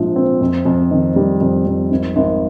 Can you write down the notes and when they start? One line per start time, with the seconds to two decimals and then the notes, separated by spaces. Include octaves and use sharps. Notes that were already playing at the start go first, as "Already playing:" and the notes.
Already playing: A#1 G#2 F3
0.16 C4
0.41 F2
0.65 F2
0.91 D#3
1.16 G3
1.41 F2
1.66 F2
1.91 G#1
2.16 G#1